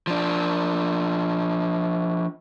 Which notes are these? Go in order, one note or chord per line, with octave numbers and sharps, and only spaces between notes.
F3 D4